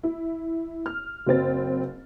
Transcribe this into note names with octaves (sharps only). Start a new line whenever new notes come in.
E4
F6
F#1 F#3 C4 A6